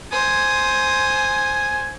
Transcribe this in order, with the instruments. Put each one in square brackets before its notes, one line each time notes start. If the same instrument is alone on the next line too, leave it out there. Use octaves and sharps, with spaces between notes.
[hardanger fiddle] C5 [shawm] G#5 [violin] D#6